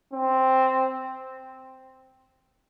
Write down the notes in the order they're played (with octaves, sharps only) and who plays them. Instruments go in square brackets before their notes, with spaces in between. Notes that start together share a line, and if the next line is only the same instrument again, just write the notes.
[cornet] C4